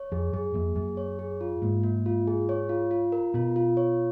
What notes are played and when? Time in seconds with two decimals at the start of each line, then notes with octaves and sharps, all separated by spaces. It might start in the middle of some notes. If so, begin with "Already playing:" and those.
Already playing: C#5
0.12 F2 G#4
0.33 F#2 G#4
0.54 F2 A#3
0.76 F#2 G#4
0.97 C#5
1.19 G#4
1.41 F4
1.62 G#2 A#3
1.83 A#3
2.06 F4
2.27 G#4
2.49 C#5
2.69 F4
2.91 F4
3.12 A#4
3.34 B2 F4
3.56 F4
3.77 C#5